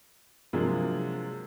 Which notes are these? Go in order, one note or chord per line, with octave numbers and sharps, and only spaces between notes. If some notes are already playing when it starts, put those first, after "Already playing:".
C3 F3 F#3 G#3 A#3 D4